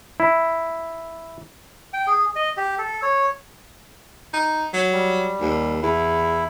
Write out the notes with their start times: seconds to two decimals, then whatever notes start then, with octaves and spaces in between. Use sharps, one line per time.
0.20 E4
1.93 G5
2.07 G#4
2.36 D#5
2.57 G4
2.79 A4
3.02 C#5
4.34 D#4
4.73 F#3
4.92 G3
5.41 D#2
5.83 E2 E4